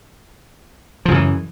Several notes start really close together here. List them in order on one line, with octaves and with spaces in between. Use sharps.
F3 C#3 F#2 E3